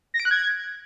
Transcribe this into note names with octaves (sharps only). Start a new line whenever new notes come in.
A#6
D7
F#6
G#6